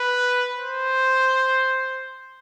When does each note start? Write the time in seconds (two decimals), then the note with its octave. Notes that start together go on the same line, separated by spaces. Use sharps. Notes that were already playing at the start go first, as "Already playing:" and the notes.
Already playing: B4
0.56 C5